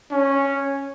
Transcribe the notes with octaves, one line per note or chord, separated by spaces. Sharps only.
C#4